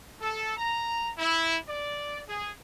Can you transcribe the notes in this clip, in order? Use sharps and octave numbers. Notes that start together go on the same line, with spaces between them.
A4
A#5
E4
D5
G#4